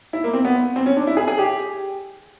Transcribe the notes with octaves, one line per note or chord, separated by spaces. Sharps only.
E4
A#3
C4
B3
C4
C#4
D4
E4
G#4
G#4
G4